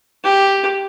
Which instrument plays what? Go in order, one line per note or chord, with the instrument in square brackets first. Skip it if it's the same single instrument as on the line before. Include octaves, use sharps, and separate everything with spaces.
[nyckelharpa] G4